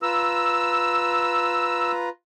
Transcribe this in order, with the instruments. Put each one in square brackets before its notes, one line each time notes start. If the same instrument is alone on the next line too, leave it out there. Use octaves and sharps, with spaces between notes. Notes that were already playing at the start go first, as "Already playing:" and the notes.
[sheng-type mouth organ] F4 B4 A#5 [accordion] E6